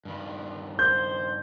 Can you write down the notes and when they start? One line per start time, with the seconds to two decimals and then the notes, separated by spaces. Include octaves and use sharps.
0.05 G2 D#3
0.79 C5 G6